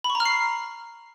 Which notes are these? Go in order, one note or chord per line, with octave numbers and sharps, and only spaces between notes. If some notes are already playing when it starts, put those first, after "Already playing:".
B5
C#6
A#5
F6
C7